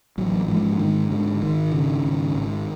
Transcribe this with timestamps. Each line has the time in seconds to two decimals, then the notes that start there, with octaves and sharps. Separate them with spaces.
0.18 A1 F#3
0.48 G#2 F3
0.79 G#2 D#3
1.10 G#2 D3
1.42 G#1 D#3
1.72 C#3
2.04 G#1
2.35 G#1